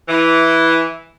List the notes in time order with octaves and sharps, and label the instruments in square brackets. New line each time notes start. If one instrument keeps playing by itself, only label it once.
[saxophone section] E3